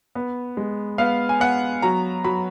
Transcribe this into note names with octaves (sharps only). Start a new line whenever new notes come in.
B3
G#3
B3 F5
G#5
B3 F#5
F#3 A#5
F#3 B5